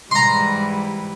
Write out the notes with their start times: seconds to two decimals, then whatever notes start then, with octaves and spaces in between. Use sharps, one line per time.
0.11 G#2 E3 G3 A#5 C6